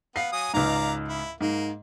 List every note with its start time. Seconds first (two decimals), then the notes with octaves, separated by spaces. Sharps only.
0.16 B3 F5 C7
0.32 F#3 G#5 D#6
0.54 C#2 G#2 D5 F5 A#5
1.08 E4
1.41 G#2 A#3